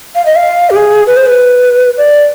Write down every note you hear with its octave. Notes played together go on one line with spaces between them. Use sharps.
F5
D#5
F5
G4
G#4
B4
C5
B4
D5